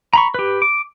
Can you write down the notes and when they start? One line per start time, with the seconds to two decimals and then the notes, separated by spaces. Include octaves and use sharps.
0.13 A#5 B5 C#6
0.34 G4 B4
0.62 D6